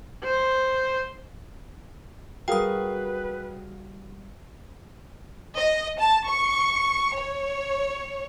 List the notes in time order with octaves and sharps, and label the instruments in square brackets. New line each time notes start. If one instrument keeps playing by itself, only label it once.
[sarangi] C5
[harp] G3 F#4 [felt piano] G#4 A#4 F5 [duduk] B4 [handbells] G5 D#6
[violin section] D#5
A5
C#6
C#5